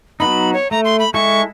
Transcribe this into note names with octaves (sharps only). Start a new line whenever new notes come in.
F#3 B3 D#4 B5
C#5
A3 A#5
C6
B5
G#3 E4 A4 C#6